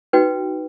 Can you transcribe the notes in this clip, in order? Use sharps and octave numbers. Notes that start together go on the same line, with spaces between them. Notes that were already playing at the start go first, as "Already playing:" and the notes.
D#4 F#4 B4 G5